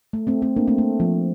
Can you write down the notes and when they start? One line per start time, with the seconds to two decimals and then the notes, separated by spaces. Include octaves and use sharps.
0.13 A3
0.27 A3 C4
0.42 A3 C4
0.56 A#3 D4
0.67 A3 C4
0.78 A3
1.00 F3